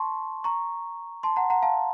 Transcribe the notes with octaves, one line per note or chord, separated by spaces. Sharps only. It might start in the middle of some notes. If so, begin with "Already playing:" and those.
Already playing: A5 C6 C#6
A#5 C#6
A5 C6
F#5 A#5
F#5 A#5
F5 A5